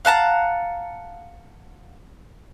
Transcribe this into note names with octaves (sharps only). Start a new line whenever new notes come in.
F5 F#5 A5 A#5